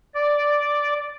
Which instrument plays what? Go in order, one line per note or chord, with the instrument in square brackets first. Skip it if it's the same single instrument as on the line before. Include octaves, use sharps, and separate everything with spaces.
[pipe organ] D5